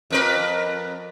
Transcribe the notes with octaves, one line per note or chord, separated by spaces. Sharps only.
F2 A#4 B4